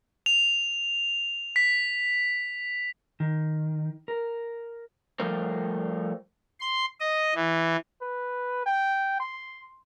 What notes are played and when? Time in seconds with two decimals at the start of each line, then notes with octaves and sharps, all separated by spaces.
0.26 F7
1.56 B6
3.20 D#3
4.08 A#4
5.20 F3 G3 A3 A#4 C5
6.60 C6
7.00 D#5
7.35 E3
8.01 B4
8.66 G5
9.20 C6